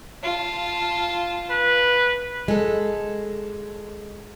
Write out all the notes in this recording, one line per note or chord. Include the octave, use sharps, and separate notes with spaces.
F4 A5
B4
G#3 A4